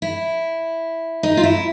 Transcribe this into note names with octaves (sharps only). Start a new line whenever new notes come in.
E4
D#4
F4
E4